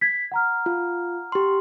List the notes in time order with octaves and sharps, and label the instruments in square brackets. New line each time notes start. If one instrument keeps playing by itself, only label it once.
[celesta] G#6 B6
F#5 A#5 F6
[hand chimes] F4
G4 C6